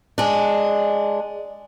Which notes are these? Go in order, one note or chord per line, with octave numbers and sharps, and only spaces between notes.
G#3 D4